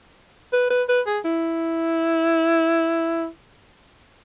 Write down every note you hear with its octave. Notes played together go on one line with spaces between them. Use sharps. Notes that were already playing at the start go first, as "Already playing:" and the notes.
B4
B4
B4
G#4
E4